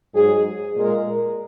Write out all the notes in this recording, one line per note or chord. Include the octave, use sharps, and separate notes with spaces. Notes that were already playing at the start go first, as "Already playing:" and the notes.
G#2 F#3 G#4
A#2 G#3 A#4